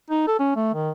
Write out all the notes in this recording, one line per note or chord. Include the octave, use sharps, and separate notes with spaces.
D#4
A4
C#4
A3
D#3